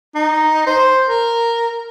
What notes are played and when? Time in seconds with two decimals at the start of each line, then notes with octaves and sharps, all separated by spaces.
0.15 D#4
0.67 C5
1.08 A#4